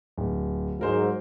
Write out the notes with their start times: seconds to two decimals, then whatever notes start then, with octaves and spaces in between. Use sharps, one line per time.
0.18 D1
0.79 G#2 F#3 A#4 C5